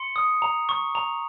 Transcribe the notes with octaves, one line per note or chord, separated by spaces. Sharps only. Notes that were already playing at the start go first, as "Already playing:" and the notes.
Already playing: C6 C#7
D#6
A#5
C#6
A#5